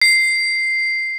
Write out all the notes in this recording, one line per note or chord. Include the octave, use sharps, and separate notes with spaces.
C7